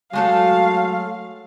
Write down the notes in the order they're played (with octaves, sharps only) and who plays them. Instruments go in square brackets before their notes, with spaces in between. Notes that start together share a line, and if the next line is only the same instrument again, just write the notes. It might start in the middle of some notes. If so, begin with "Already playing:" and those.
[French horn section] F#3 [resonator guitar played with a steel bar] G#3 A3 A4 [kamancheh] F5